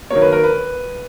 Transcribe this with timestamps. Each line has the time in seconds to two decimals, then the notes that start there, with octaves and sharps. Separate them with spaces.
0.10 D#3 F#3 A#3 C#5
0.22 B4
0.33 A#4
0.44 B4